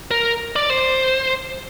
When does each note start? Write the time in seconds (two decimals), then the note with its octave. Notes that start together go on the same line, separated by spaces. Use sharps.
0.11 A#4
0.56 D5
0.70 C5